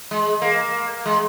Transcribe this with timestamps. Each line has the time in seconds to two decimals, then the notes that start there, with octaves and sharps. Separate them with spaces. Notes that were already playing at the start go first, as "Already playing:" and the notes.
0.11 G#3
0.42 A#3
1.06 G#3